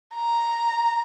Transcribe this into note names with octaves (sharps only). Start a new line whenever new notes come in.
A#5